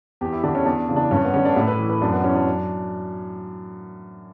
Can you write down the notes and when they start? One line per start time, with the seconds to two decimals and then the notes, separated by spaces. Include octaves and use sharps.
0.21 E2 G4
0.33 E4
0.43 D3 D4
0.55 C#4
0.66 E2 D4
0.89 C#3 E3
0.96 D4
1.11 G2 C#4
1.25 B3
1.34 D3 C#4
1.45 D4
1.56 A2 E4
1.68 B4
1.79 E3
1.90 B4
2.02 F#2 D4
2.13 B3
2.24 E3 C#4
2.35 D4
2.46 F#2